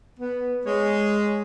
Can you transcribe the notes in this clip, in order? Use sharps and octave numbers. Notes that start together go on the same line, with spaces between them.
B3
G#3 C#5